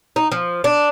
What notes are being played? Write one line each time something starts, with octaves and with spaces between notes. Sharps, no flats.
D#4
F3
D4